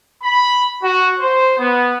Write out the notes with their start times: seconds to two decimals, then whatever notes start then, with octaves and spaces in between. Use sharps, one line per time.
0.22 B5
0.82 F#4
1.20 C5
1.58 B3